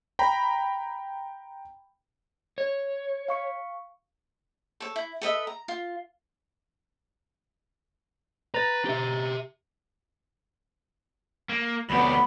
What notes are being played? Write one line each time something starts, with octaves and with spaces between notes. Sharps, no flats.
G5 A#5 B5
C#5
F5 C#6 C#7
A4 C#5
E4
A4 B4 D#5 E5
A#5
F4
B4 A#5 A6
G4 E5
A#3
D2 F#3 B3 G4 B5